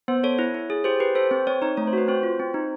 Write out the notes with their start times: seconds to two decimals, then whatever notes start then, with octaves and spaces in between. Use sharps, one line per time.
0.08 B3 C5
0.23 A4 C#5
0.39 E4
0.54 E4
0.70 G#4
0.84 G4 C5
1.00 G4 B4
1.15 A4 C5
1.31 C4 C5
1.47 C4 C#5
1.62 D#4 C#5
1.77 A3 C#5
1.87 C5
1.93 F#4 B4
2.08 C4 C5
2.23 F4
2.40 C4
2.54 D#4